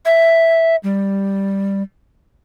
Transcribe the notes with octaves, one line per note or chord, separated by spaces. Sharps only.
E5
G3